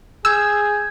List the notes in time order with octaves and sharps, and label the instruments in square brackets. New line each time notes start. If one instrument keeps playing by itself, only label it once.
[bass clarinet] G#4 [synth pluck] E6 [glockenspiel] G6 G#6